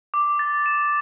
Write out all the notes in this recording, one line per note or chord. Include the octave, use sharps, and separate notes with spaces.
D6
A6
E7